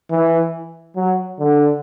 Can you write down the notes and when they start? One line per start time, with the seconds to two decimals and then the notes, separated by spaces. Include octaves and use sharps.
0.11 E3
0.96 F#3
1.39 D3